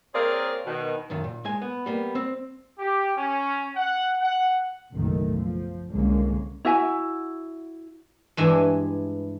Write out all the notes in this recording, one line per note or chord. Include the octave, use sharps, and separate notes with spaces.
A#3 C4 G#4 A#4 C#5 D5
B2 D#3
B1 F#2 D#3
A#2
G#3 G#5
B3
G3 A#3 B3
C4
G4
C#4
F#5
F#5
F#1 B1 B2 D#3 A3
F3
C2 D3 G#3 A#3 C#4
E4 F#4 E5 G#5
G2 E3 G#3 E5 G#5